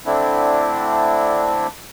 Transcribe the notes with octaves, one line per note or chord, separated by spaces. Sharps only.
D3 A3 C4 D4 E4